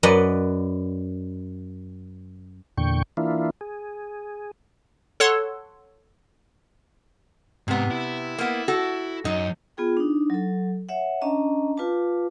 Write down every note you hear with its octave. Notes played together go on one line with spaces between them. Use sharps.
F#2 B4 D5 D#5 F#5
E2 A#2 D3 G5 C#6
E3 A#3 D4 E4 F4
G#4
A4 C#5 F#5 C6
G#2 C3 B3
E4
A#3 B3
F#4 A4
F#2 D#4
B3 F4 G#4 G5
D4 D#4
F#3 A4
C#5 E5 F#5
C#4 D4 D#5 A5 A#5
F4 B4 F5 A5 D6